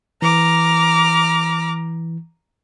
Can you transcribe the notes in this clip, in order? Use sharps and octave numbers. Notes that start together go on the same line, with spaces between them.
E3 A#5 D6 F6